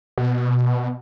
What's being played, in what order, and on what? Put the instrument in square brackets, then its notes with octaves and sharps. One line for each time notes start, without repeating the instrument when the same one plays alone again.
[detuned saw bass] B2